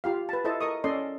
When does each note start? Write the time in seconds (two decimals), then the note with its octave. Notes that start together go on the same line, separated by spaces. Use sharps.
0.04 F4 G4 F5
0.29 B4 A5
0.45 E4 A4 C5 D#5 A5
0.61 A#4 D#5 C#6 D#6
0.84 C#4 A4 D5 D#5 C6